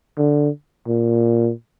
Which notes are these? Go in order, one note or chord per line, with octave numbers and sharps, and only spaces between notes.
D3
A#2